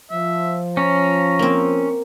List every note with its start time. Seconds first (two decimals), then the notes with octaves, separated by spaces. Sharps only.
0.11 F3 E5
0.77 C#4 A#5
1.39 A#3 C4